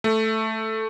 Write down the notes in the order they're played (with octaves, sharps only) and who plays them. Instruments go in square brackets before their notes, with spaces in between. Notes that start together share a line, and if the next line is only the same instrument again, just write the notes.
[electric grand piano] A3